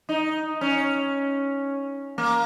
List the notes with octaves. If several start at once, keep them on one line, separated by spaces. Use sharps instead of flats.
D#4
C#4
A#3